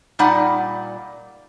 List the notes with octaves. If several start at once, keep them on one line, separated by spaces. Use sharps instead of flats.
A#2 G3 D#4 D5 F#5